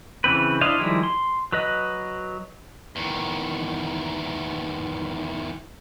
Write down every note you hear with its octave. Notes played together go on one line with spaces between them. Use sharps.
C#3 E3 C4 B4
D4 E4 C5 D#5 F5
D#3 F3 G3 G#3 E4
C6
F#3 B4 D#5
E2 D#3